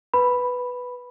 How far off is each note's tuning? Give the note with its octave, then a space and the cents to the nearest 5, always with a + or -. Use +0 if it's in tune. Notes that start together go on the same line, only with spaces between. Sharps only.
B4 +0 B5 +0